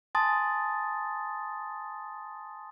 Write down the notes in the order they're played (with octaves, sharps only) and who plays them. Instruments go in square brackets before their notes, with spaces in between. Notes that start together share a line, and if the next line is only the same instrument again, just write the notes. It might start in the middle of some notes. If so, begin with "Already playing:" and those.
[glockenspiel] G#5 A5 C6 D#6 A6